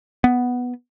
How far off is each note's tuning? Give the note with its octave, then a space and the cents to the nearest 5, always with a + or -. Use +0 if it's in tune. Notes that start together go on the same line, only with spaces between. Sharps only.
B3 +0